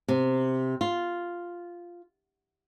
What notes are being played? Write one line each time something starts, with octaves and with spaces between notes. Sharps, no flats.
C3
F4